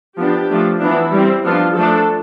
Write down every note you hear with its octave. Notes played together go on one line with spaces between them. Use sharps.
F3 B3 D4 G4
F3 A3 D4
E3 B3 D4 E4
G3
C4
F3 B3 D4 F4
F3 A3 D4 A4